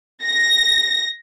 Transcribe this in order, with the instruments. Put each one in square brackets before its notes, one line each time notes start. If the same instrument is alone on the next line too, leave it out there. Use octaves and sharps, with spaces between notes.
[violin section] A#6